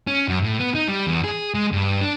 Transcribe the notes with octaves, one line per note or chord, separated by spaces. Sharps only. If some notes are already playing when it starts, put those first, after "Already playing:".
C#4
F#2
A2
B3
D#4
G3
E2
G#4
G#3
G2
D4